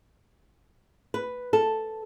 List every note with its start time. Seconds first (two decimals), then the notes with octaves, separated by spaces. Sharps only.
1.14 B4
1.53 A4